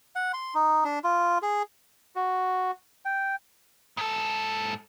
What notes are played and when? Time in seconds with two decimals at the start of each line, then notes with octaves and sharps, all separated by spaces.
0.16 F#5
0.34 C6
0.55 D#4
0.85 D4
1.04 F4
1.42 G#4
2.16 F#4
3.05 G5
3.97 G#2 A4